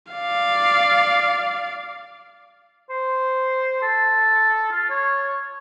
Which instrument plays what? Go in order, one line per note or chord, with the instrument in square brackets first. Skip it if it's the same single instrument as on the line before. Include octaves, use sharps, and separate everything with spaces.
[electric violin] D5 F5
[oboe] C5
A4
F4
C#5